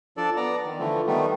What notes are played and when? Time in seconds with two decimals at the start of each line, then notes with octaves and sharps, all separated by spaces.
0.17 F3 D4 A4 D5
0.37 B3 D5 A#5
0.65 D#3
0.79 D3 E3 F3 A3
1.07 D#3 G3 A3 B3